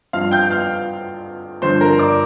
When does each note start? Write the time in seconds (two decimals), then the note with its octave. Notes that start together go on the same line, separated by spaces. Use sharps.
0.13 G2 F3 F5 F6
0.31 G5 G6
0.50 F5 F6
1.62 G2 D3 F3 C5 C6
1.81 A#4 A#5
1.99 D5 D6